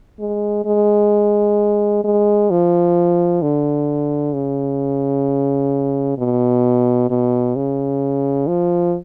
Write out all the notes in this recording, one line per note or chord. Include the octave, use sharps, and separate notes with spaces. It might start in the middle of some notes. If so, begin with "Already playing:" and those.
G#3
G#3
G#3
F3
D3
C#3
B2
B2
C#3
F3